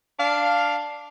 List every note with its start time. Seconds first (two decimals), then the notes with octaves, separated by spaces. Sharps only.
0.19 D4 F5